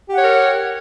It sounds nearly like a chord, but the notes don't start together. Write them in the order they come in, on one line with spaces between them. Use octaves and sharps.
G4 F#5 C#5 A#4